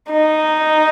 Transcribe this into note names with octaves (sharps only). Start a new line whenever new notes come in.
D#4